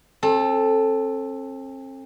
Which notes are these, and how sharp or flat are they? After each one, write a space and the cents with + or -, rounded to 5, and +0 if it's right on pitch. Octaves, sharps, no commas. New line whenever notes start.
C4 +40 A4 +0